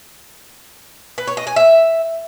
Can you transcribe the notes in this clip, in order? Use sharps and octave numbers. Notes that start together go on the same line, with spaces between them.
B4
C#5
D#5
G#5
E5